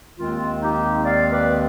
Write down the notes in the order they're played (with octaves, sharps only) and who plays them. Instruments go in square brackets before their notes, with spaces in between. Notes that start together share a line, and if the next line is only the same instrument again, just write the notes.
[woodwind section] D#2 D#3 G#3 C4 F4
D#4 G4
D5 F5
B4 D5